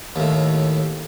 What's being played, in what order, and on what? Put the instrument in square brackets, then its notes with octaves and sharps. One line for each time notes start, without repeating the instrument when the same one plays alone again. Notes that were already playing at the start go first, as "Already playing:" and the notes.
[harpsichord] D#2 A2